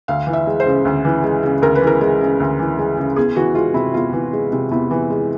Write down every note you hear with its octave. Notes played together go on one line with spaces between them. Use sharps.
D2 F5
E3
E5
G#3
C5
C#3
D2
E3
G#3
C#3
D2 A#4
B4
E3
A#4
G#3
C#3
D2
E3
G#3
C#3
E2 G#4
E3 F#4
G#3 F4
C3 E4
E2 F4
E3
G#3
C3
E2 E4
E3
G#3